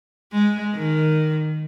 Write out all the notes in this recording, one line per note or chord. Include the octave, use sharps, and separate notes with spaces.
G#3
D#3